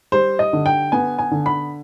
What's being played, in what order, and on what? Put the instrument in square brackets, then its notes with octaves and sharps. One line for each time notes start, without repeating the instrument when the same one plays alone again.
[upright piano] G3 C5
D#5
D3
G5
B3 G#5
G#5
D3
B5